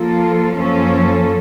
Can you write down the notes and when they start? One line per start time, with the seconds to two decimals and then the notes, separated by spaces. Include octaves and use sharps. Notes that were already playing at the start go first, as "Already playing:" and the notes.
Already playing: F3 A#3 F4 A4
0.56 F#2 F3 A#3 C#4 A4